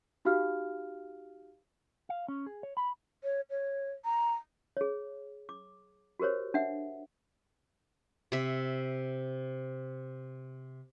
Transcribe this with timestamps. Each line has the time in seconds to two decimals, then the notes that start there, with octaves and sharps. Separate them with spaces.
0.25 D#4 F#4 G4 F5 F6
2.09 F5
2.28 C#4
2.46 G#4
2.63 C#5
2.77 B5
3.24 C#5
3.50 C#5
4.05 A#5
4.77 G#4 C#5
5.49 D6
6.19 F#4 G4 A#4 C5 C#5
6.54 D4 E5 F#5
8.32 C3 E5